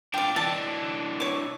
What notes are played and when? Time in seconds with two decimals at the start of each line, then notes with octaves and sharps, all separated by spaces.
0.14 D4 F4 D5 G5
0.36 E3 D4 A5
1.20 C#5 D6